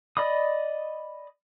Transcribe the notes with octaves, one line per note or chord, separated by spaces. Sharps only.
D5 D#5 B5 D#6